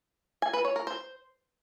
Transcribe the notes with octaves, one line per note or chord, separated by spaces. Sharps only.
G#5
B4
C#5
A#4
C5